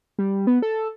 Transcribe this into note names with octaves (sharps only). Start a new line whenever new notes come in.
G3
B3
A4